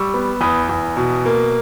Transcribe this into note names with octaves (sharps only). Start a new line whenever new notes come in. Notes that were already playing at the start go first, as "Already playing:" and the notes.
Already playing: G3 C#6 E6
B3
E2 B5 D#6
E2
B2
A#3